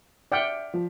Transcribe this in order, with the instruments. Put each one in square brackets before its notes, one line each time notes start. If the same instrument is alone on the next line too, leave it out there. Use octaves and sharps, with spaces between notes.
[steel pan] D5 F#5 G5 [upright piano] E5 F6 B6
[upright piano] F3